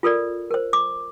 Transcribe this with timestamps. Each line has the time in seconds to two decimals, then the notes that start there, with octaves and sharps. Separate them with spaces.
0.03 F4 A4 A#4 D5
0.51 A#4 C5
0.73 D6